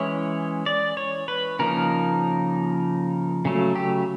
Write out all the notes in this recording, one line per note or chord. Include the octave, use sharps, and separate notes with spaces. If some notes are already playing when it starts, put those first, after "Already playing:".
Already playing: E3 G#3 C#4 E4 C#5
D5
C#5
B4
C#3 F3 A#3 D#4 A#4
C#3 F#3 A3
G4